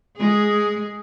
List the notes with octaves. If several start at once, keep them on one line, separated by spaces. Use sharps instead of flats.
G#3 G#4